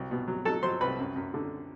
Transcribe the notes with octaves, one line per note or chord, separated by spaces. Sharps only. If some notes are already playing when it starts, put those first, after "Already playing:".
Already playing: C2 F#3
B2
F#3
F#3 A4 A5
F#3 C5 C6
C2 B4 B5
F#2
F#2
D3